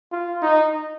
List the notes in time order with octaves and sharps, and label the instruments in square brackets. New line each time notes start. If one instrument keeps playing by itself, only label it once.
[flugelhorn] F4
D#4